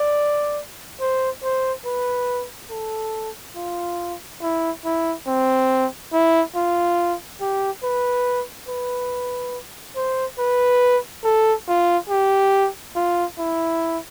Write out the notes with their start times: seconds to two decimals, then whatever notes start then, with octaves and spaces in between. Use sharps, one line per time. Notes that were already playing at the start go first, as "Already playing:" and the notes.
Already playing: D5
1.00 C5
1.43 C5
1.85 B4
2.70 A4
3.56 F4
4.41 E4
4.85 E4
5.27 C4
6.13 E4
6.55 F4
7.41 G4
7.83 B4
8.68 B4
9.96 C5
10.39 B4
11.24 A4
11.68 F4
12.09 G4
12.95 F4
13.38 E4